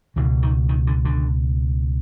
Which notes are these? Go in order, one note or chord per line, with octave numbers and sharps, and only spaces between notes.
C#2 B2 D#3
D#3
D#3
D3
D3